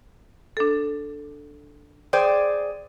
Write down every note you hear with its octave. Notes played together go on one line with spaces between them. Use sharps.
D4 A4
G#4 C5 D5 G5